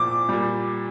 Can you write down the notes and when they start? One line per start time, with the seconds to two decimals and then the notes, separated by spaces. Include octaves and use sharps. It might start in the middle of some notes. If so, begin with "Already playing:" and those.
Already playing: A#2 F3 D6
0.29 A#2 G3